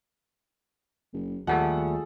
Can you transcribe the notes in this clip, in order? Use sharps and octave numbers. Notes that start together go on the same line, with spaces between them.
F#1
D#2 F3 G3 A3 G#4 A4 F#5